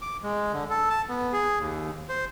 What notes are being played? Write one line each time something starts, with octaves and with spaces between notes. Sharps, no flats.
D6
G#3
D3
A4
A5
B3
G#4
D#2
C5